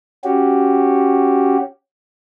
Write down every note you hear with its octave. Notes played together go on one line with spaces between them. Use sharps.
C#4 F#4 G4